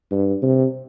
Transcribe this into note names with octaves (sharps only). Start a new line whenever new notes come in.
G2
C3